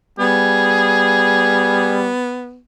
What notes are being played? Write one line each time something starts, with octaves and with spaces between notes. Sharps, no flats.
G3 B3 G#4